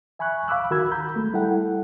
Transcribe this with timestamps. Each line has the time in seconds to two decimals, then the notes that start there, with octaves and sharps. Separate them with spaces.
0.19 E5 G#5 B5 C#6 F#6
0.48 F5 B5 D6 E6 F#6
0.71 D#3 F#4 A#4 B5 E6 G#6
0.91 A#5 B5 G6
1.16 G#3 A3
1.33 G3 E4 A4 F#5 G5